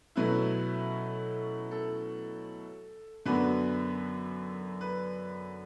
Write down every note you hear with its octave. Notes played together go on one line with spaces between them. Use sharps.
B2 F#3 A3 C#4 E4 B4
A4
F#2 D3 F#3 B3 D4 B4
B4